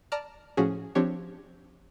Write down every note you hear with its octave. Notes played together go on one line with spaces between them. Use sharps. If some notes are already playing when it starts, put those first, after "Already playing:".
D5 A5 A#5 F6
A2 F3 C#4 F4 F#4 G#4
F3 C4 D4 G4 C#5